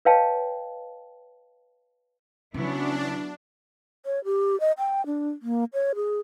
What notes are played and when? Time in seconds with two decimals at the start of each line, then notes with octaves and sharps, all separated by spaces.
0.05 B4 C#5 D#5 F5 G5 A5
2.54 C#3 F#3 B3 C#4 D4 E4
4.06 C#5
4.25 G4
4.60 D#5
4.78 G5
5.06 D4
5.42 A#3
5.73 C#5
5.95 G#4